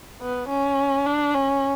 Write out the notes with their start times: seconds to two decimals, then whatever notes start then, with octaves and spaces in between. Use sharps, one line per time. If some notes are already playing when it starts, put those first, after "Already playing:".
0.22 B3
0.49 C#4
1.06 D4
1.34 C#4